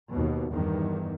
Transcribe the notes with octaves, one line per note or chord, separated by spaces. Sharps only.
D#2 B2
E2 G2 D#3